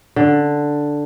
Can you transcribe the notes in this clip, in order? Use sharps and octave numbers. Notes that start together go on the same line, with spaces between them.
D3